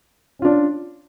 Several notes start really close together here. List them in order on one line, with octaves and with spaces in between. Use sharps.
C#4 F4 D4